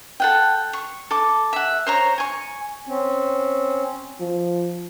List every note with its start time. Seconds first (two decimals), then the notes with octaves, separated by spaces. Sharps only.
0.20 A4 F#5 G5
0.73 C#6
1.11 A4 D6
1.53 E5 F#5
1.87 C5 C#5 A#5
2.18 G#5 C#6
2.87 C4 C#4
4.20 F3